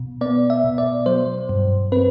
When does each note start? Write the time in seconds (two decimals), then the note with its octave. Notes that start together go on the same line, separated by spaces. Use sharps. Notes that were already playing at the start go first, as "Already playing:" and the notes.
Already playing: B2
0.21 B3 D5
0.50 E5
0.64 B2
0.78 D5
1.06 F#3 C5
1.49 G2
1.92 C4 B4